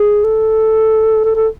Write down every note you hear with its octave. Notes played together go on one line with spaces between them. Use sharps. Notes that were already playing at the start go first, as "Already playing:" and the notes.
Already playing: G#4
A4
A4
A4